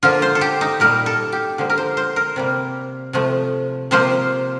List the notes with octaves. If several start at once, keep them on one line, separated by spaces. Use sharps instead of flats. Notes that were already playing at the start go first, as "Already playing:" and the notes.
D3 F3 A#3 F4
C5
A4
G4
D#4
A#2 G3 A#3 A#4
A4
G4
D3 F3 A#3
A#4
C5
C5
A#4
C3 G3 A#3
C3 F3 A3
C3 F3 A#3 C5